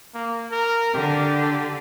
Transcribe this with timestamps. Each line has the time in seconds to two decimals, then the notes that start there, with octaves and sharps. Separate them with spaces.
0.14 A#3
0.52 A#4
0.94 D3 D4 G4